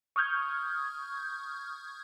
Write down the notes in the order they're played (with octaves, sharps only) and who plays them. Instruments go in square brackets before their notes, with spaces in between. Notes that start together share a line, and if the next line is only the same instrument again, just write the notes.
[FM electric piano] C#6 D#6 F6 G6 G#6